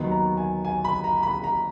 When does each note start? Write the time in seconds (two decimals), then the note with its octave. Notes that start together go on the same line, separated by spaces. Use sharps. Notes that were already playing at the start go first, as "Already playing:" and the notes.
Already playing: D#2 D#3 F#3 B3
0.12 A#5
0.37 G#5
0.65 G#5
0.85 B5
1.04 A#5
1.23 B5
1.44 A#5